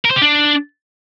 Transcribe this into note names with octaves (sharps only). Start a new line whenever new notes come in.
A#4
C5
G4
D4